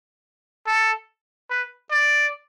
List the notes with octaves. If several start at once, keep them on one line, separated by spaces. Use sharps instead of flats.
A4
B4
D5